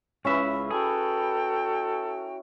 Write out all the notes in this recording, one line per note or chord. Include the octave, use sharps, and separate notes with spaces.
C#2 C#3 C#4 E4 B4 E5
F#4 G#4 A4 G5 A#5